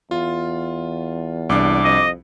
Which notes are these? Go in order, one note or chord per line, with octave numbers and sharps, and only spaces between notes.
E2 F4
C2 D4 D6
F2 D#5